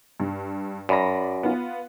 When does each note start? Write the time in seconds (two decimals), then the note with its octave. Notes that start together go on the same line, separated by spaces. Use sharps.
0.20 G2
0.89 F#2 D5 B5 A#6
1.43 B3 F4